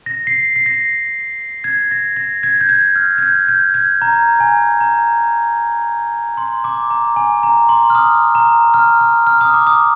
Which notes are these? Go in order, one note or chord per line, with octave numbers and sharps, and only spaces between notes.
A#6
C7
C7
A#6
G#6
A#6
A#6
G#6
G6
G#6
F6
G#6
G6
G6
G#6
A#5
G#5
A#5
C6
D6
A#5
G#5
A#5
C6
F6
D#6
A#5
F6
F6
F6
D#6
D6
D#6